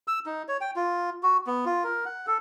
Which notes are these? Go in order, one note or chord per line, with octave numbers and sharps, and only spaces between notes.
E6
D#4
C#5
G5
F4
F#4
B3
F4
A#4
F#5
A4